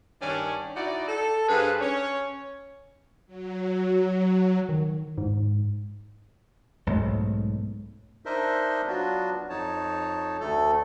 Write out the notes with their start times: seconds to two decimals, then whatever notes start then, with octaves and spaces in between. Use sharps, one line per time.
0.21 G2 D#3 C#4 C#5 D5
0.75 D#4 E4 F#4 D5
1.08 A4
1.49 G2 G#4 B4 C5 F5
1.81 C#4 C#5
3.27 F#3
4.69 D#3
5.18 G#2
6.87 B1 G#2 A3
8.26 D4 D#4 A#4 C5 D#5 E5
8.87 F#3 B3 D4 F4 F#4
9.49 F2 D#4 C#5 A5
10.40 D2 A3 A4